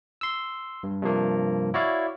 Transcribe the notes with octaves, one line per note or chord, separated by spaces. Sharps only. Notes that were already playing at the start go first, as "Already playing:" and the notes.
C6 E6
G2
G2 C3 F3 A#3
E4 F#4 C#5 D5 F5